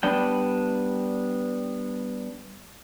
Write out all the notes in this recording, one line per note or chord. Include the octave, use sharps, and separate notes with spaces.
G3 B3 D4 G5